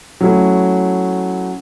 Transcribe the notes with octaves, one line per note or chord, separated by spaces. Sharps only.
F#3 A3 C#4 E4